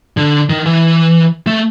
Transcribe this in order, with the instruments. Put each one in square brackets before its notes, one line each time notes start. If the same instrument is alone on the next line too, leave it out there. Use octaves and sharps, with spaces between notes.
[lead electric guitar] D3
D#3
E3
A3